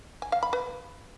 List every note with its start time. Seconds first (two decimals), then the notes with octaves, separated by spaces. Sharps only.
0.22 G#5
0.32 F5
0.43 B5
0.53 B4